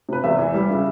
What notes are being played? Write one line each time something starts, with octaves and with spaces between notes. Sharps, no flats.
C3 B4
E2 E5
E3
G3
C#3